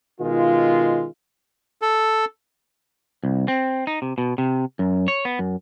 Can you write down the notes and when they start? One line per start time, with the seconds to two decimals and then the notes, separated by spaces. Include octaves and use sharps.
0.21 B2 D#3 G#3 F4
1.82 A4
3.24 C2
3.48 C4
3.87 D#4
4.02 C3
4.18 B2
4.38 C3
4.79 F#2
5.08 C#5
5.25 B3
5.39 F#2